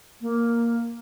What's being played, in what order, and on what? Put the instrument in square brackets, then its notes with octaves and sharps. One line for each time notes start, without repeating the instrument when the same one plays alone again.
[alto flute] A#3